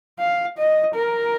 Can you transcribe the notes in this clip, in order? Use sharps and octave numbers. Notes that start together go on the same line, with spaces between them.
F5
D#5
A#4